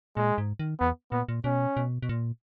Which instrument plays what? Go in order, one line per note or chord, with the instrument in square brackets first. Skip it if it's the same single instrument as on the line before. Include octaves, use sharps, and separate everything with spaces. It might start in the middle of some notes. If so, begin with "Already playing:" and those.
[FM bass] A#2 [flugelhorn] G#3
[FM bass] G#2
D#3
[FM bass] E2 [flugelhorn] B3
[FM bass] A#2 [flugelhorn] B3
[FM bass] A#2
[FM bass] B2 [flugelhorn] C#4
[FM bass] B2
B2
A#2